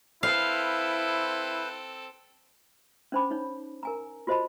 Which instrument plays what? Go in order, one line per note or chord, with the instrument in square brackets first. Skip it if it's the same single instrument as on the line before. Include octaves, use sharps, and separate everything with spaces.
[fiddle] C4 A4 [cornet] E4 [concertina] B4 C5 [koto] F5
[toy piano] C#4 D4 C5 A5 B5 D6
D#4 C#5
A#4 G#5 A#5
F4 F#4 C5 D#5 A5 B5